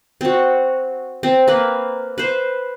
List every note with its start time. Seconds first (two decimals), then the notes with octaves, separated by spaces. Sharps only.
0.21 C4 F#4
1.23 C4
1.48 A#3 C4 B4
2.18 B4 C5